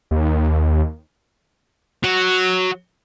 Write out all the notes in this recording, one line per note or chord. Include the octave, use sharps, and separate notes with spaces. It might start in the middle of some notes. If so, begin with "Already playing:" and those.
D#2
F#3